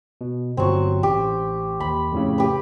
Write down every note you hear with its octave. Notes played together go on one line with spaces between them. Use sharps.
B2
G1 F#3 C4 C#6
A1 G4
D#2 B5
F2 A2 C#3
G4 B4